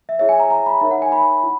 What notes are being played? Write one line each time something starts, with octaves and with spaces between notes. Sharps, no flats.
E5
E4 G#4 C#5 E5
G#5
A#5
A#5
B5
D#4 A#4 C#5 E5
F#5
G#5
B5
E4